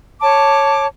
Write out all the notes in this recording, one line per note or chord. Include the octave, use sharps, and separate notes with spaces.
C#5 A5 D6